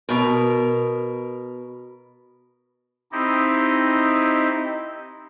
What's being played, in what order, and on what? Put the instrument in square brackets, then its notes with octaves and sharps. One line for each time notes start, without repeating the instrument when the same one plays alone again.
[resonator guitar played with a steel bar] B2 A#4
[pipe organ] C4 D#4 E4 G4 D#5